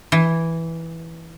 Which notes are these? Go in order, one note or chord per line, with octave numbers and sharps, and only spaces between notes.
E3